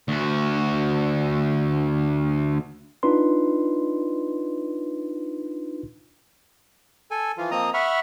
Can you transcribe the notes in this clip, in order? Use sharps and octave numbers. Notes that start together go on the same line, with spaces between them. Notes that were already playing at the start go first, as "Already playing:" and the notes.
D2 F#4
D4 D#4 F4 B4 C6
A4 G#5
E3 F3 F4
F3 A#3 C4 D#5 A#5 D#6
E5 F#5 B5 C#6 F6